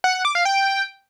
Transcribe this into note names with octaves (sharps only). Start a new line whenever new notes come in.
F#5
F#5
D6
F5
G5